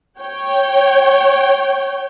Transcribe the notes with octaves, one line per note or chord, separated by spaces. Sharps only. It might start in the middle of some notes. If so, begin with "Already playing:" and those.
C#5 G5